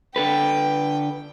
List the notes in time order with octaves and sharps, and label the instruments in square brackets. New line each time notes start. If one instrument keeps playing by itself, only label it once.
[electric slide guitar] D3 A4 B4 [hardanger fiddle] G5